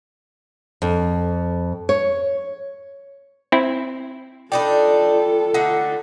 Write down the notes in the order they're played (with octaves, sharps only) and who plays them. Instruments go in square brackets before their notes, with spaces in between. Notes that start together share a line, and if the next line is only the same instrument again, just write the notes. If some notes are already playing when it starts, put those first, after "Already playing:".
[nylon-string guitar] F2
C#5
[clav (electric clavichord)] C4 E4
[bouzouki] D4 D#4 D5 [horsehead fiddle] F4 A4 [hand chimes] G5 B5
[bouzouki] D3 A3 D#4 [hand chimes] F#5